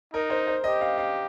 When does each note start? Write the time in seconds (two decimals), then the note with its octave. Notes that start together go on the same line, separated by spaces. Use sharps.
0.13 D#4 A#4
0.30 C5
0.47 C5
0.64 G4 D#5
0.81 F5
0.98 F5